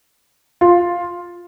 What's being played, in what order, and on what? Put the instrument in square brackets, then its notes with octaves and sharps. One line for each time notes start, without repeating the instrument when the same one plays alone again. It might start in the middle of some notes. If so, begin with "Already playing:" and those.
[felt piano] F4